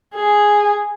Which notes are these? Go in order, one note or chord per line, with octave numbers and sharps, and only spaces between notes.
G#4